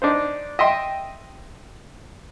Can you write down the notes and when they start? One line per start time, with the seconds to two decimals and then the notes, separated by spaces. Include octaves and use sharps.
0.02 D4 D#4 C5
0.59 D#5 E5 G5 C6